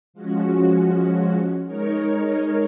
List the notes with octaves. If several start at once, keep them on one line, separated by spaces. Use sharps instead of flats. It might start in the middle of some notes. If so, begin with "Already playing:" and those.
F3 G#3 C#4 F#4
G#3 D#4 A#4 C#5